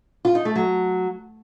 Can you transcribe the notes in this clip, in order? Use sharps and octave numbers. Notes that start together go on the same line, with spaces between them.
F4
D#4
A3
F#3